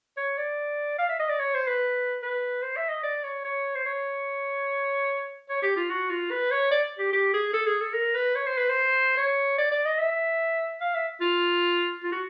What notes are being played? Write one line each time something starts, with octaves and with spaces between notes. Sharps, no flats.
C#5
D5
F5
E5
D#5
D5
C#5
C5
B4
B4
C5
E5
D#5
D5
C#5
C#5
C5
C#5
C#5
G4
F4
F#4
F4
B4
C#5
D5
G4
G4
G#4
A4
G#4
A4
A#4
B4
C#5
C5
B4
C5
C#5
D5
D5
D#5
E5
F5
E5
F4
F4
F#4